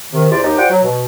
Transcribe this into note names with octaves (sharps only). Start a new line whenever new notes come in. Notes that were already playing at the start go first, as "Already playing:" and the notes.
C3 D#3
E2 C3 E3 F4 G4 D5
D#2 D#4 G4
F4 C5 D5 F#5 G5
F#3
B2